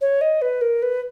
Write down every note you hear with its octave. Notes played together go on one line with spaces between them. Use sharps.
C#5
D#5
B4
A#4
B4